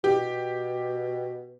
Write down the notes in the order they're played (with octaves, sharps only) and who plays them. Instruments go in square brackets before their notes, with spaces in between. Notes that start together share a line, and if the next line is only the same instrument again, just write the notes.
[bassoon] B2 [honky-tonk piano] G4